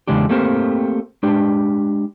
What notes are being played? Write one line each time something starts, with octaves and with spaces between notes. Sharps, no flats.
E2 C#3 G#3 D4 G4
A3 A#3 C4 G4 A#4 C5
G#3 D4 G4